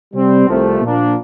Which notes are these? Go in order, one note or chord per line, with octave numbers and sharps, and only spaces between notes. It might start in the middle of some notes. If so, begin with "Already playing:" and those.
C3 G3 C4
C2 C3 F3 A3
A#2 F3 A#3 D4